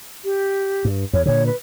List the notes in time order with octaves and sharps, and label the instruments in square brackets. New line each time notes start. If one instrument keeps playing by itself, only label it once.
[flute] G4
[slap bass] G2
[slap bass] E2 [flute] C#5
[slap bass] A#2 D3 [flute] C#5
[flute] B4